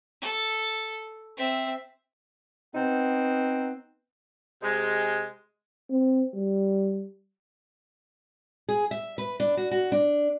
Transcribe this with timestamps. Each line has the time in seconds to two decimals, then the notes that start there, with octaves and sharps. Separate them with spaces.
0.21 A4
1.37 C4 E5
2.75 B3 C4 D#4 F#5
4.63 C3 G#3
5.90 C4
6.34 G3
8.69 G#4
8.91 E5
9.18 B4
9.40 D4
9.57 F#4
9.71 F#4
9.92 D4